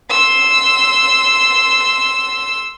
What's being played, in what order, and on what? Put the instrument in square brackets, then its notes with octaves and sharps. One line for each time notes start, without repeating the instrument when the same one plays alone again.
[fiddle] C6 E6